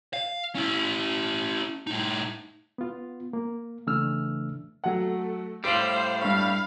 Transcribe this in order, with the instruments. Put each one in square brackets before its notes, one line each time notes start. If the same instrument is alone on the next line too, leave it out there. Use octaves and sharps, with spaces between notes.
[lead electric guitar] F5
C#4 E4
A2 D#4
[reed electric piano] B3 F4
A#3
C#3 E3 A3 D4 E6 F6
[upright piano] F#3 F#5 [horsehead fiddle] A3
[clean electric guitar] A2 G3 [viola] C5 [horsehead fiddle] F5 [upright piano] D7
[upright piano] G2 C#6 [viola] F5 [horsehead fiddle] B5